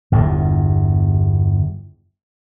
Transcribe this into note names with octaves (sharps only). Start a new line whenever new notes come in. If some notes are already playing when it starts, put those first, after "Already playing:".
G1 E2 G2